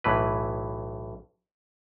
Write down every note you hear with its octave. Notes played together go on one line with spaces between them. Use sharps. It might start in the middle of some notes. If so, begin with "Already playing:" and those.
B1 A2 E3 B4